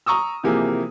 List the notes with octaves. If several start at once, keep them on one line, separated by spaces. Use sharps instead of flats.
A#5 C#6 D#6 E6
C3 E3 F3 A#3 G4 G#4